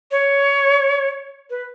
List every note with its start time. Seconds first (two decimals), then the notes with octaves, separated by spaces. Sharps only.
0.11 C#5
1.50 B4